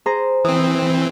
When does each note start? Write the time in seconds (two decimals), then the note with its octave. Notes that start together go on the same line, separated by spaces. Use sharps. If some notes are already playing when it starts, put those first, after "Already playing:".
0.06 G#4 C5 A#5
0.44 E3 C4 D#6